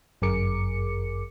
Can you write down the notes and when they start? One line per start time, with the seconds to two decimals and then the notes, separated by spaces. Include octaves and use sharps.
0.22 G1 F#2 G#4 A#4 D6 C#7